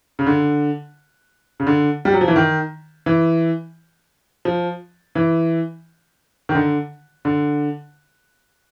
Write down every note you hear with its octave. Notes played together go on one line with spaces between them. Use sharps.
C#3
D3
C#3
D3
G3
F#3
F3
E3
D#3
E3
F3
E3
D#3
D3
D3